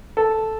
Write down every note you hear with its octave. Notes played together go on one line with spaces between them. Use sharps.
A4